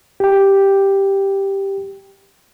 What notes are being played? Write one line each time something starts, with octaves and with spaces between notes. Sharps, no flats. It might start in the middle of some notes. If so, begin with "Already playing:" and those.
G4 G5